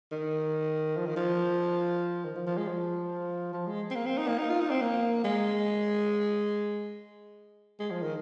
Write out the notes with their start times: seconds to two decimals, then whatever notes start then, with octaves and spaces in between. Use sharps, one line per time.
0.12 D#3
0.97 F3
1.07 D#3
1.16 F3
2.25 D#3
2.36 F3
2.47 F3
2.57 G#3
2.68 F3
3.53 F3
3.67 G#3
3.91 C4
3.95 A#3
4.06 C4
4.18 D#4
4.28 A#3
4.38 D#4
4.49 F4
4.60 D#4
4.71 C4
4.81 A#3
5.24 G#3
7.80 G#3
7.91 F3
8.03 D#3